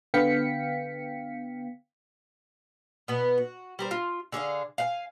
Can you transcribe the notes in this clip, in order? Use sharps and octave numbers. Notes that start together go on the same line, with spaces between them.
D3 B3 F5 G5 B6 C#7
B2 B3
F#4
G3 A#4 C5
F4
D3 G#4 C#5 F5
F5 F#5 G#5